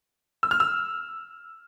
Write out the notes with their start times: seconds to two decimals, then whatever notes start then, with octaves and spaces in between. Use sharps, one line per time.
0.43 E6
0.51 F6
0.60 E6